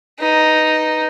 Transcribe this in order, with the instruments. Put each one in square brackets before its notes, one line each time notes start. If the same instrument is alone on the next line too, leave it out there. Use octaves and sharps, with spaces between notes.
[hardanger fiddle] D#4 [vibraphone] B4